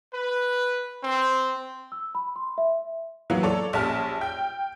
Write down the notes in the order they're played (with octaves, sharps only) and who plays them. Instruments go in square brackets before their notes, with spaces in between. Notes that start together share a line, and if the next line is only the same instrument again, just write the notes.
[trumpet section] B4
C4
[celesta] E6
B5
C6
E5
[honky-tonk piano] E3 F#3 A#3 B3
A4 C#5 D5
A#1 G3 C#4 A5 F6
G5